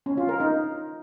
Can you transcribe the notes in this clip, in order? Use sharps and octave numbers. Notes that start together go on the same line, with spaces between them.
C#4
F4
A#4
D#4